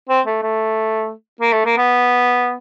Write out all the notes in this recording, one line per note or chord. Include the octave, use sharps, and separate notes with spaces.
C4
A3
A3
A#3
A3
A#3
B3